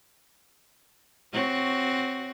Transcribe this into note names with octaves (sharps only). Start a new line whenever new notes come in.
C4 F#4 C#5